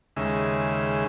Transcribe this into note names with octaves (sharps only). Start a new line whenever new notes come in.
D#2 C#3 G#3 E5